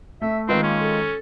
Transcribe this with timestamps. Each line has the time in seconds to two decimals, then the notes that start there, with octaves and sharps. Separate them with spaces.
0.22 A3 E5
0.49 D#3 G#3 C4 F4 B4
0.63 A#3 C#4
0.81 A4